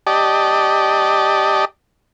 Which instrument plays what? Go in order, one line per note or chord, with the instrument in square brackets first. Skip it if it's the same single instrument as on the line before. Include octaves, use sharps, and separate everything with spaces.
[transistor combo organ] G4 D5 D#5 A5